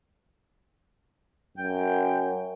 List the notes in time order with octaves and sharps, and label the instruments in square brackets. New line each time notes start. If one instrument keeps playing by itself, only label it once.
[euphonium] F#2 [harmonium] G5